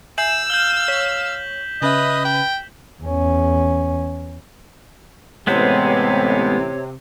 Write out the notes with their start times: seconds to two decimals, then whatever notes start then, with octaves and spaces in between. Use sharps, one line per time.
0.18 E5 G#5 E6 G6 C7 E7 F#7
0.50 F5 F6 G6 F#7 G7
0.88 C#5 B6
1.82 C#3 C#4 B4 D#5 E5
2.25 G5
3.02 E2 C#4
5.47 A1 C3 G#3 B3 C5 C#5